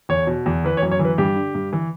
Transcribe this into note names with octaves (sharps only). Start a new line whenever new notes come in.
E2 C#5
B2
E2
E3 B4
C#5
F#2
C#5
E3
B4
G2 G4
D3
G2
E3